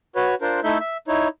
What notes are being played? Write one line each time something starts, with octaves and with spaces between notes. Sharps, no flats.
F#4 B4 C#5
D4 F4 A#4 C5
A3 D#4 E4 A4 E5 G6
E5
D#4 E4 C#5